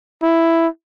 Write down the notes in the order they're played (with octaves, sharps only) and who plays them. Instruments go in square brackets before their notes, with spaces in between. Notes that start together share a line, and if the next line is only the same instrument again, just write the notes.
[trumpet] E4